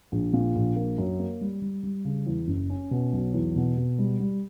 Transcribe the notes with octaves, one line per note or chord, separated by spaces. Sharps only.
A#1
A#2
A#1
A#3
F#2
A#3
G3
G3
G3
C#3
E2
F#1
C#4
B2
B1
E2
B2
B2
G3
G3